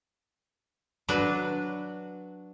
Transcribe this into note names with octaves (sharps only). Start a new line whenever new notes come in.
F#3 D4 F#4 B4